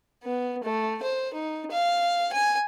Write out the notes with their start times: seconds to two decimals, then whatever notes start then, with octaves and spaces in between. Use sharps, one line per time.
0.23 B3
0.64 A3
1.03 C5
1.34 D#4
1.71 F5
2.33 G#5